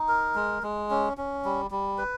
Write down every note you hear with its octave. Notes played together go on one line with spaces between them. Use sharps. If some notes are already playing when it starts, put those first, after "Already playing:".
Already playing: D#4
A#4
G#3
G#3
C#4
C#4
G3
G3
B4